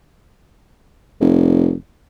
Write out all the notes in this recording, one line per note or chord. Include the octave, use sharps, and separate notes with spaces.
F1